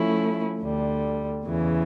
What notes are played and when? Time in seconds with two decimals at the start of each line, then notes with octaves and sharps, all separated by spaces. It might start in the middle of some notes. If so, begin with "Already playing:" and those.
Already playing: F3 A3 C#4 E4
0.60 D2 D3 G3
1.44 E2 C#3 E3